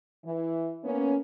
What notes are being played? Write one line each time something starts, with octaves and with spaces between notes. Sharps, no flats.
E3
A#3 B3 C#4